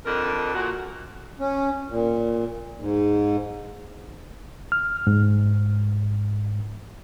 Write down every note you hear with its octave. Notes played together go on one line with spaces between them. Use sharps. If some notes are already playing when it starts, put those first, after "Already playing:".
F2 D3 D#3 A#4
A#2 F#4
C#4
A#2
G#2
F6
G#2